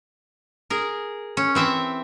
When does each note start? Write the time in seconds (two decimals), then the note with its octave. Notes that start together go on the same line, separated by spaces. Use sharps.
0.70 G#4 A#4
1.37 C#4
1.55 E3 C4 E5